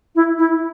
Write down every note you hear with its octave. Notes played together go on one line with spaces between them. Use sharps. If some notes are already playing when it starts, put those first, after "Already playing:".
E4
E4